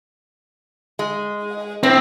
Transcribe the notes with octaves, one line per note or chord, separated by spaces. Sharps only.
G#3
A2 C4